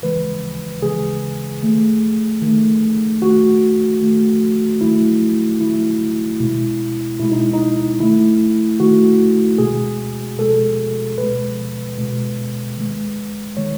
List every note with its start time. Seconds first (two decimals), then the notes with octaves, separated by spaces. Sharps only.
0.02 C#3 E3 G#3 B4
0.82 C#3 E3 G#3 G#4
1.63 D#3 A3
2.42 D#3 A3
3.22 D#3 A3 F#4
4.02 D#3 A3
4.81 D#3 F#3 A3 E4
5.61 D#3 F#3 A3 E4
6.40 B2 G#3 E4
7.20 B2 G#3 E4
7.32 D#4
7.54 D#4
8.00 D#3 A3 E4
8.80 D#3 A3 F#4
9.58 B2 G#3 G#4
10.38 B2 G#3 A4
11.18 B2 G#3 B4
11.98 B2 G#3
12.78 D#3 G#3
13.57 D#3 G#3 C#5